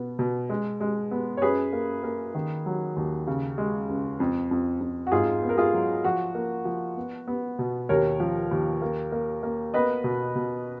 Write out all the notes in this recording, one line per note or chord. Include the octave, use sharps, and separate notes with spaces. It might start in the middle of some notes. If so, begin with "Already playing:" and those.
Already playing: B2 B3
B2
G#3
G#3
B3
C#5
F#2 G#4 B4
A#3
A#3
D#3
F#3
D#2
C#3
G#3
C#2
F2
F2
F2
F#4
G#2 F4 G#4
B3
A#4
F4 G#4
F#3
F3 F#4
A#3
F3
B3
B3
B2
D#2 A#4 C#5
F3
D#2
A#3
A#3
A#3
B3 B4 D#5
B2
B2